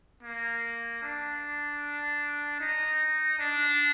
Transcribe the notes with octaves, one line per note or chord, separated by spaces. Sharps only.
A#3
D4
D#4
D4